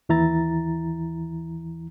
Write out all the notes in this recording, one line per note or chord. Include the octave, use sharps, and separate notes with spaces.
D#2 E3 E4 A#5 A6